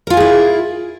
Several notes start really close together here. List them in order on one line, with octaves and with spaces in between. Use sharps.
A#4 F4 G#5 G#4 E4